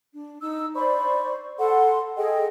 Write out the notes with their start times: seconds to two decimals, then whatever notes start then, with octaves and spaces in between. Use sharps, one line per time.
0.13 D4
0.41 D#4 E6
0.75 C5 D5 B5 C#6
1.58 A4 F#5 C6
2.17 G#4 A4 D#5 G5